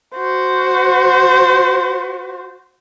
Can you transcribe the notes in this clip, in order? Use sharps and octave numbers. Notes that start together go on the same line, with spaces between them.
F#4 C5